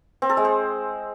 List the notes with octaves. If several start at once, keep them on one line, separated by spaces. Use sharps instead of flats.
C4
A4
G#3
C5